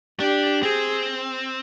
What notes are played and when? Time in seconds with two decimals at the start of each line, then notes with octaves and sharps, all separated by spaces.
0.20 D4 G4
0.63 C4 G#4